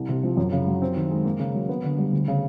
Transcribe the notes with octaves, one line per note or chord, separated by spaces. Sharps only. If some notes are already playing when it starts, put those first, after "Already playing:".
Already playing: C2
C3
F3
F#2
C#3
F#3
C4
D#3
G#3
A#3
C#3
F#3
B3
D3
G3
D2
C#3